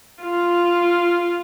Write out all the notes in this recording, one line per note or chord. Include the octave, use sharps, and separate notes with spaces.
F4